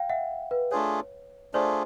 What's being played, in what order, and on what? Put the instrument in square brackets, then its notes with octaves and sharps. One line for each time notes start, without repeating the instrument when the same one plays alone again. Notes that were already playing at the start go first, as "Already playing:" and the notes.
Already playing: [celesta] F5 G5
E5 F#5
B4
[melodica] A3 D4 F4 G#4 [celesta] C#5
[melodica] A3 D4 F4 G#4 [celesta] C5 D5